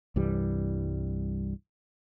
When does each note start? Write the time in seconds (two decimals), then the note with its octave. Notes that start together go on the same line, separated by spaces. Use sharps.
0.16 C2 G2 E3 G3